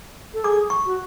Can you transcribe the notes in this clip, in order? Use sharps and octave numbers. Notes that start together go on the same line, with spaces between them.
A4
G#4 D6
C#6
F#4